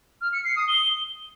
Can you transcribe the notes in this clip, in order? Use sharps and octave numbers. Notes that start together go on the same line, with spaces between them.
F6
C#7
C7
D#6
G7